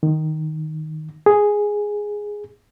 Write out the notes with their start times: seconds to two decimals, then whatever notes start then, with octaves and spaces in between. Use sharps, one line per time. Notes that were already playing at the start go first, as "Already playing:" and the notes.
0.03 D#3
1.26 G#4